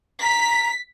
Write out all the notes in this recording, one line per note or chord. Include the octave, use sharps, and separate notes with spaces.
A#5 B6